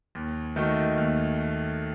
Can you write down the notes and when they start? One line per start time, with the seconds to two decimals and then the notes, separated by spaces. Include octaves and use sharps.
0.15 D#2
0.56 D#3 A3 D#4 F#4
0.98 D#2